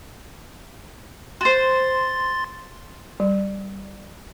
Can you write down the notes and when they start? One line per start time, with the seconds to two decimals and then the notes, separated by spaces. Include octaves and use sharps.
1.41 F#4 C5 C6 A6
3.20 G3